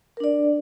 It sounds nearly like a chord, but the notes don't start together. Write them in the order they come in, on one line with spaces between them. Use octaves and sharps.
A#4 D4 D5